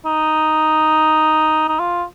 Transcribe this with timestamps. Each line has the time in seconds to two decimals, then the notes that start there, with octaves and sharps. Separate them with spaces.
0.05 D#4
1.69 D#4
1.79 F4